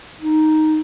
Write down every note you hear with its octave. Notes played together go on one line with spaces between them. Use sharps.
D#4